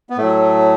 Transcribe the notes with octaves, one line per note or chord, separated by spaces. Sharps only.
B3
A2 A3
F#3